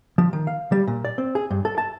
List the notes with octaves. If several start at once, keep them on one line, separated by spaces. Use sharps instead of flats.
F3
D#3
F5
G3
A#2
D5
C4
G#4
G2
A4
A5